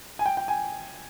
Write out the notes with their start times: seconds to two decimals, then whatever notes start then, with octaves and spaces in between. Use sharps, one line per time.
0.19 G#5
0.26 G5
0.37 G5
0.48 G#5